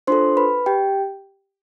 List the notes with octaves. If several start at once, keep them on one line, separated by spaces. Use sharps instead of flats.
D4 F4 A4 C5 C6
B4 B5
G4 G5